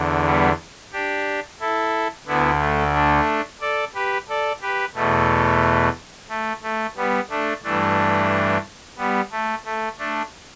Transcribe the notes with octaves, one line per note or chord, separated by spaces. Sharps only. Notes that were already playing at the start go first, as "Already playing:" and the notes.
Already playing: E2 D3
G3 B3
D4 G4
E4 A4
D2 D3 B3 E4
A3
A3 D4
A4 D5
G4 B4
A4 D5
G4 B4
E2 B2 A3
A3
A3
G3 B3
A3 D4
G2 E3 A3 D4
G3 B3
A3
A3
A3 D4